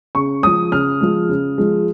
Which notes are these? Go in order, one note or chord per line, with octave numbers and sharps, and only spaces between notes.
C#3 C#6
F3 G#3 D#6
C#3 F6
F3 G#3
C#3
F3 G#3